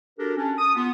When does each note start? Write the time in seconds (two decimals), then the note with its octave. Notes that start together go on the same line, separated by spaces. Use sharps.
0.18 D4 F#4 G4 A4 A#4
0.36 C#4 D4
0.58 D#6
0.76 B3 F4